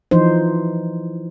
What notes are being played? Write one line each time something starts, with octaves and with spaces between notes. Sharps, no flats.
E3 F3 D#4 C5